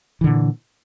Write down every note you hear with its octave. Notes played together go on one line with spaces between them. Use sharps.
A#2 D3 E3